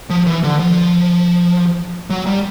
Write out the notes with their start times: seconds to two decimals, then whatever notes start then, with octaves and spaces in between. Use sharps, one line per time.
0.10 F3
0.27 E3
0.44 D3
0.59 F3
2.10 F#3
2.26 G3